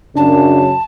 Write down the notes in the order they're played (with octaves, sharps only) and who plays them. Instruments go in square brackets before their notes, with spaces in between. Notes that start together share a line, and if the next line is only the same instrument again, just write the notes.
[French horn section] F#2 C#3 [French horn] D4 [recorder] A5